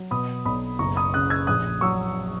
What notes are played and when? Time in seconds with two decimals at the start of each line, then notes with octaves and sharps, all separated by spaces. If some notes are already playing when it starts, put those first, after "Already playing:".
Already playing: F#3
0.11 B2 B5 D#6
0.45 B1 B5 D#6
0.79 F#1 A#5 C#6
0.96 B5 D#6
1.14 C#3 D#6 F#6
1.30 E6 G#6
1.47 A#1 D#6 F#6
1.81 F#3 C#6 E6